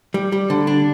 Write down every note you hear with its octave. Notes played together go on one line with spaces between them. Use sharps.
G3
G3
D3
D4